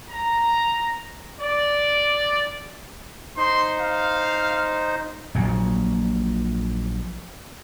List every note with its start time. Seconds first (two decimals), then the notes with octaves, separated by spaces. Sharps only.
0.10 A#5
1.40 D5
3.37 D#4 C5 C6
3.80 F5
5.35 A#1 A#2 F#3